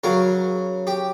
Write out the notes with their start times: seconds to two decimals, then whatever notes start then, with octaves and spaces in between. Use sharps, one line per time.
0.04 C#3 F#3 A#4
0.87 G4